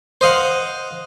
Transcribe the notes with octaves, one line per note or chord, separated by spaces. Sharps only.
C5 D#5 F5 F#5